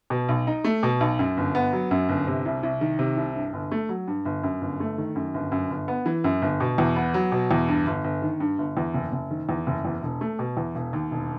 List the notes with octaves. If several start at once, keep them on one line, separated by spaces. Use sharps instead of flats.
B2
B1
D#4
A3
B2
B1
F#2
G1
B3
F#3
F#2
G1
C3
C2
C2
D#3
C3
C2
G2
G1
A3
F#3
G2
G1
F#2
G1
A3
D#3
F#2
G1
F#2
G1
B3
E3
F#2
G1
B2
E2
B3
F#3
B2
E2
G2
G1
G1
D#3
G2
G1
E2
F#1
F#1
D#3
E2
F#1
E2
E1
A3
B2
E2
E1
D#2
E1